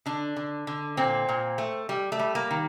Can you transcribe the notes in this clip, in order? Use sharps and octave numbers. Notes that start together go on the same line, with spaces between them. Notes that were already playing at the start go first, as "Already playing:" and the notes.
D3 D4
D3
D3
A#2 C4
A#2
A3
G3
A3
G3
A#3
D#3